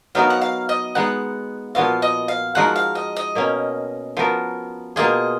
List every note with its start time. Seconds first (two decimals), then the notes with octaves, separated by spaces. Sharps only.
0.15 F#3 B3 D#4 F#4 A#4 F5
0.30 F#5
0.41 F5
0.69 D#5
0.95 G#3 B3 D#4 F#5
1.75 A#2 F3 B3 F#4 F5
2.02 D#5
2.28 F5
2.55 F3 G#3 D#4 F#4 A#4 F#5
2.76 F5
2.95 D#5
3.16 D#5
3.35 B2 A#3 C#4
4.17 F3 B3 F#4 A#4
4.96 B2 A#3 F4 G#4 D#5